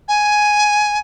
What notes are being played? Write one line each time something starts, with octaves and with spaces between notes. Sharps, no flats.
G#5